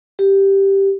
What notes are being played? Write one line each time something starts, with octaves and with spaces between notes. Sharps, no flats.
G4